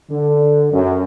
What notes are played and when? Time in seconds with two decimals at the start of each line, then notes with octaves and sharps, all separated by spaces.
0.10 D3
0.71 F#2